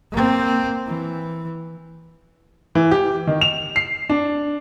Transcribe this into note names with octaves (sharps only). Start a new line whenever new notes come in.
A#3 C4
E3
E3
G4
D#3
F7
C7
D4